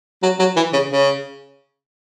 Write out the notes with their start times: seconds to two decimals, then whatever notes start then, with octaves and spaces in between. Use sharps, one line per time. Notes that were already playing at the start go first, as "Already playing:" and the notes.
0.23 F#3
0.39 F#3
0.56 E3
0.73 C#3
0.90 C#3